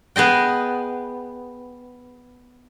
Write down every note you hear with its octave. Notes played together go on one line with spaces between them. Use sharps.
B3 G#4 D#5 G5